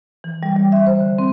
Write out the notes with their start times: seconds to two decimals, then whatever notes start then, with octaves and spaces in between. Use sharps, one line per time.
0.24 E3
0.43 G3
0.56 G3
0.72 E5
0.86 C5
1.01 D3
1.19 C4